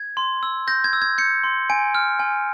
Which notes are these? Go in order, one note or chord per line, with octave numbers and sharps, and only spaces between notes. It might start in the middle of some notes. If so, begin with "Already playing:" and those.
Already playing: G#6
C6
E6
G6 A#6
G#6
E6
G#6
G6 C#7
C6
G#5 D7
F6
G#5